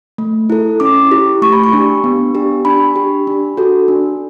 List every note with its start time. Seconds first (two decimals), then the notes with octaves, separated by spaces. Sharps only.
0.18 A3
0.50 E4 A4
0.80 C#4 D6
1.11 E4 G4
1.42 A3 C#6
1.53 B5
1.64 C#6
1.73 D4 G4
2.04 B3
2.35 D4 G4
2.65 D4 B5
2.96 G4
3.27 D4
3.58 F#4 A4
3.88 D4